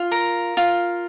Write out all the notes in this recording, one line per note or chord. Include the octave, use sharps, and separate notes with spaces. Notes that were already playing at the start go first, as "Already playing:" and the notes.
Already playing: F4
A#4
F4